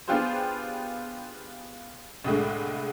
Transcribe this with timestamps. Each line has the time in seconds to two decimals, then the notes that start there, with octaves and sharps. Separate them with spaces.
0.08 B3 D4 F4 G4 G#4 C5
2.24 C2 A2 D3 G#3 A3